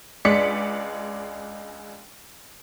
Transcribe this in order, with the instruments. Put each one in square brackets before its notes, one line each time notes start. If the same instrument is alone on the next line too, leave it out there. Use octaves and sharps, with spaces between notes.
[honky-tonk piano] C#2 G#3 D4 D5 B6 C#7